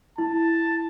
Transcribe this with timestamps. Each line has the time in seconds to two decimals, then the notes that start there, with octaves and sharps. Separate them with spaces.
0.18 E4 A5